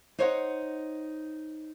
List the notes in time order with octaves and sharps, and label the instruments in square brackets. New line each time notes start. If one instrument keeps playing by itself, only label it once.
[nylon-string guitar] D#4 C5 C#5 D#5 E5 F#5